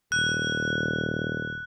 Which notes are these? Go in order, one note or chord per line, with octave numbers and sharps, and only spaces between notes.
D#1 F#6